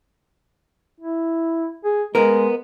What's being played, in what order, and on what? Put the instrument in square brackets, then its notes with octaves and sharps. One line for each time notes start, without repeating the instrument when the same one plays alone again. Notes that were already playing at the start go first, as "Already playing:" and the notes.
[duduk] E4
G#4
[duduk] G#3 [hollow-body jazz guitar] B3 A#4